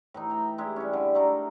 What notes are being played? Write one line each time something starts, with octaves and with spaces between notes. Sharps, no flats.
A2 E3 D#4
G5 A#5
G#3 E4 G4
G3 C#4
D3
A3 D#4 A#4